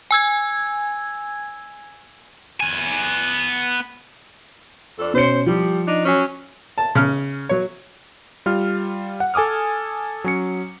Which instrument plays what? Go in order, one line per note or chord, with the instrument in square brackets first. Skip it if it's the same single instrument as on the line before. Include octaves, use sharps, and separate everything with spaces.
[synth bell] G#5 E6 G#6
[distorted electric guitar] B3 G#5
[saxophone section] F2 D4 A4
[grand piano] B2 C#4 C#7 [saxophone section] C5
[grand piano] F3 [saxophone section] G3
[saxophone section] D4 D#4
F#3 C#4
[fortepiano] A5
C#3 F6
F#3 C#5
[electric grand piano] G3 F4 F6
F#5
A4 G#5 D6 D#6 F6
F#3 C#4 C#7